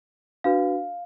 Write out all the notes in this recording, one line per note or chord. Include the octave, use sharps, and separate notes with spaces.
D4 F#4 B4 F5